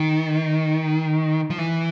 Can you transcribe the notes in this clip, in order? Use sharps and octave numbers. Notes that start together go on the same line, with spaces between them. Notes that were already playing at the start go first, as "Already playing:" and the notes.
Already playing: D#3
F3
E3